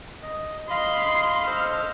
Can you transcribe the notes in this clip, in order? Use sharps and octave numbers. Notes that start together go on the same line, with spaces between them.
D#5
D#5 F5 B5 C6
A4 C5 D#5 F6